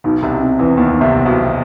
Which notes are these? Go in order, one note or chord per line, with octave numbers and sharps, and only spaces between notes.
B1 B2 D#4
C2 C3
C4
E2 E3
D#2 D#3 B3
D#3
C2 C3
B1 B2